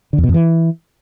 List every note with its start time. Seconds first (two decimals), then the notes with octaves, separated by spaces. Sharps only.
0.13 D3
0.18 E2
0.24 B2
0.29 F2
0.34 E3